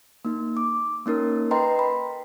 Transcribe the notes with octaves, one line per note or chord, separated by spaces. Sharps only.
A#3 D#4
D6
A#3 C#4 D#4 A#4
B4 D#5 G5 A#5 C6
B5